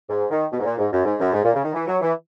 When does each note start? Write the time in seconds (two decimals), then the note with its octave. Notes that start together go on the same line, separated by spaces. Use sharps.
0.10 G#2
0.30 D#3
0.52 B2
0.59 G#2
0.65 A#2
0.78 G#2
0.92 F#2
1.05 G#2
1.20 F#2
1.33 G#2
1.44 A#2
1.54 C#3
1.64 D#3
1.74 E3
1.87 F#3
2.02 E3